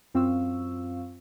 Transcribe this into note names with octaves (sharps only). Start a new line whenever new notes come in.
F#2 C4 F4 F5 C#6 E6